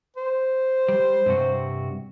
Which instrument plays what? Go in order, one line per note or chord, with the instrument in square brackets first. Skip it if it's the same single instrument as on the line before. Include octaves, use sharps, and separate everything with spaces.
[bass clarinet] C5
[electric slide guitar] G3
G2 C3 F#4